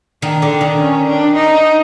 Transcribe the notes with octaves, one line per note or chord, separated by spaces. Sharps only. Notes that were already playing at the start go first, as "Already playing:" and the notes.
D#3 D4
D3
D4
D#3
C#4
D4
D#4